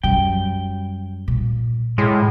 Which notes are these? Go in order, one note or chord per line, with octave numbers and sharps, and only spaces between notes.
F#2 G3 G5
A#2
A2 G#3